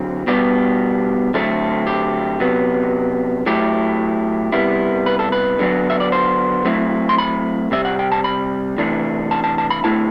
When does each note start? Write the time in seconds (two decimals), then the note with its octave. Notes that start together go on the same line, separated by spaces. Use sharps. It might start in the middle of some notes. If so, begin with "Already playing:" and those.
Already playing: D3 F#3 C4
0.27 B2 G3 B3 D4 G4
1.34 D3 F#3 A3 C4 A4
1.87 G4
2.40 C3 F#3 B3
3.46 A2 F#3 A3 E4 G4
4.52 C3 G3 B3 E4
5.06 B4
5.19 A4
5.32 B4
5.59 D3 F#3 B3 D4
5.90 E5
6.00 D5
6.12 C5
6.65 F#3 A3 C4 E4
7.09 C6
7.18 B5
7.71 C3 G3 C4 E5
7.85 F#5
7.99 G5
8.12 A5
8.24 B5
8.78 C3 E3 A3 D4
9.31 A5
9.44 A5
9.58 A5
9.70 B5
9.84 D3 A3 C4 E4 A5